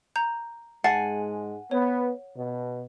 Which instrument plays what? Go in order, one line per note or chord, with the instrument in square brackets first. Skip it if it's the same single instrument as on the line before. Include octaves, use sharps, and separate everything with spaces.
[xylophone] A#5 G6
[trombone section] G#2 G#3 [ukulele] F#5 G#5 [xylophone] A5 A6 C7
[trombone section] B3 [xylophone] C#5
[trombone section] B2